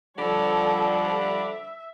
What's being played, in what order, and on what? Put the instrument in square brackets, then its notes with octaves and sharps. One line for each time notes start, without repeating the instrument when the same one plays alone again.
[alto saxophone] D3 [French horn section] F3 G3 [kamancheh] A4 C#5 [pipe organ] B5 D6
[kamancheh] E5